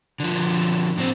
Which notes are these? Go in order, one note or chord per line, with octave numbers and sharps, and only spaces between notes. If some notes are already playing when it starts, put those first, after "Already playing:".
D3 F3
A2 C4